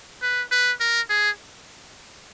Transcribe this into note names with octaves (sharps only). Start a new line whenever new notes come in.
B4
B4
A#4
G#4